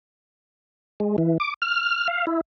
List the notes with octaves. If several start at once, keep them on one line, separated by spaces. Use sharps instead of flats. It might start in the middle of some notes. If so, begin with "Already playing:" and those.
G#3
E3
D6
F6
F5
E4